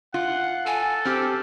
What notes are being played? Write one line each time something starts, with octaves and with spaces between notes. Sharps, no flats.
F4 F#5
A4 G#5
C4 G4 F6